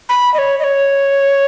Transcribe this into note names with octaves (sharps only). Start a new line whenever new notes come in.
B5
D#5
C#5
D#5
C#5